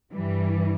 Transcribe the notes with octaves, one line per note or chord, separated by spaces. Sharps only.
G2 E3 G3